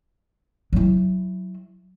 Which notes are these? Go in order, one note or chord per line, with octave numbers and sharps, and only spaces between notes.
F#3 E4